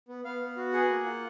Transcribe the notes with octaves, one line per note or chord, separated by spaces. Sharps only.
B3
B3 F5
B3
F#4
G#4 F#5
A#3
F4